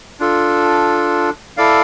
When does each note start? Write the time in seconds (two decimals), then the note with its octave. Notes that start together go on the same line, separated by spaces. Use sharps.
0.20 D4 F4 A4
1.57 E4 A4 D5 F5